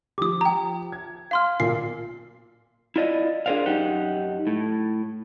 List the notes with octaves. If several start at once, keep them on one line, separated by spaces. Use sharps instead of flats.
F3 G4 D6 D#6
G5 A#5
G#6
F5 C6 F6
B1 A#2 C7
E4 F4 D5 D#5
D4 G#4 A#4 C5 D5 F5
F#2 D#4 G4 F#5
A2